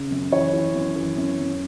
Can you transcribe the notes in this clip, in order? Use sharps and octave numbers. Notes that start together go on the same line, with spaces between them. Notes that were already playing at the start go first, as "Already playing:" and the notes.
Already playing: C#3
F#2
E3 C#5
E3
F#2
E3
F#2
F#2